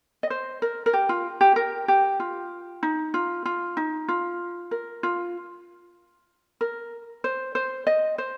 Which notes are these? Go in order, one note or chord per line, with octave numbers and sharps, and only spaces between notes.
D#5
C5
A#4
A#4
G4
F4
G4
A#4
G4
F4
D#4
F4
F4
D#4
F4
A#4
F4
A#4
C5
C5
D#5
C5